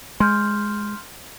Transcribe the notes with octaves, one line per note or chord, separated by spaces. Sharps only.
G#3 C6 F6 G6